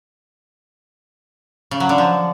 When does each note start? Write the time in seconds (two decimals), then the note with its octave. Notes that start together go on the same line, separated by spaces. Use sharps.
1.71 C#3
1.80 F#3
1.89 D3
1.98 F3